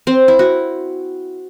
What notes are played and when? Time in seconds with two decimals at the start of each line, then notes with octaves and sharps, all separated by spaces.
0.07 C4
0.28 E4
0.39 F#4